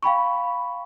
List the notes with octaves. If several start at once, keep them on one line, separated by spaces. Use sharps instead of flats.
F5 G5 B5 C#6